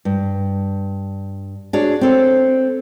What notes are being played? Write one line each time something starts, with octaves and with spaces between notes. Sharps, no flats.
G2
D4 F#4 G#4 C#5 D5
C4 A4 C#5